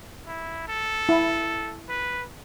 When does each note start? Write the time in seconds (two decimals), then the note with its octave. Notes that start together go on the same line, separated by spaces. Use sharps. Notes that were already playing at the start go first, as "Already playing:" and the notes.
0.27 E4
0.68 A4
1.09 E4
1.89 B4